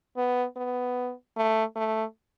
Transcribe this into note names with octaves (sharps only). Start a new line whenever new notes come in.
B3
B3
A3
A3